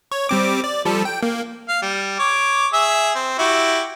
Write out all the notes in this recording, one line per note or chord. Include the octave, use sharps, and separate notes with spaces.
C#5
G3 C4 D6
D5
F3 G3 A4
G5
A#3
F5
G3
C#5 D6
G#4 E5 E6
C4
E4 F#4 G4